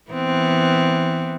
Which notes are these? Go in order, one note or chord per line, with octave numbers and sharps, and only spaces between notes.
E3 B3 C4